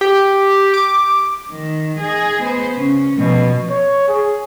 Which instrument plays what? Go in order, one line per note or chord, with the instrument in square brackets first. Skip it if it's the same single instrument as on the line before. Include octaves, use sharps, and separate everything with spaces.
[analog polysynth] G4
D6
[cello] D#3
G#4 D#5
B3 C5
C#3 C#4
B2 F3
[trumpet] C#5
G#4